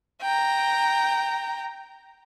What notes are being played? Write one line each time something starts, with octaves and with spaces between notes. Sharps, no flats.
G5 A#5